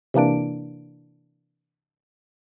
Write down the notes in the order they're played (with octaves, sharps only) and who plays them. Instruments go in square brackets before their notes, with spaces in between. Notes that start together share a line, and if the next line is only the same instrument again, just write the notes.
[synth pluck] C3 E3 A#3 D4 D7